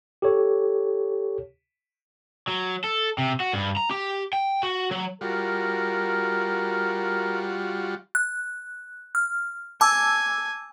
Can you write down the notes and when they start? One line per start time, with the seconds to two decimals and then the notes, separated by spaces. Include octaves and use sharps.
0.22 G4 A4 C#5
2.48 F#3
2.84 A4
3.18 C3
3.40 F#4
3.53 G2
3.77 A#5
3.91 G4
4.33 G5
4.63 F#4
4.91 F#3
5.21 G3 F4 F#4 A#4
8.15 F#6
9.15 F6
9.81 G#5 A5 D6 E6